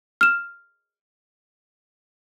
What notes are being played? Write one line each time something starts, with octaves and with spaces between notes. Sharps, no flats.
F6 E7